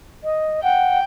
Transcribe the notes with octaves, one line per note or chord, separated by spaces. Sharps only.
D#5
F#5 G5